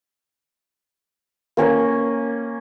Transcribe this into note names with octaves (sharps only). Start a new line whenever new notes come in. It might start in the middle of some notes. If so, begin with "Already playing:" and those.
A#3 C#4 A#4